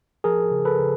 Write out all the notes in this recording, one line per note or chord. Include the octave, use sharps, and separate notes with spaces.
F3 G#4 A#4
C#3
A4 B4
C#3